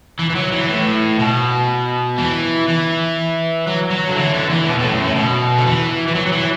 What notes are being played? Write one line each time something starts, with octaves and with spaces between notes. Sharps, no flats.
E3
E3
F#3
E3
A2
B2
E3
E3
F#3
F#3
D3
E3
D3
E3
B2
A2
F#2
A2
B2
D3
E3
E3
F#3
F#3
E3